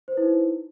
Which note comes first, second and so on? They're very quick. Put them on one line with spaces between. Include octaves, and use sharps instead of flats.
C5 B4 E4 D#4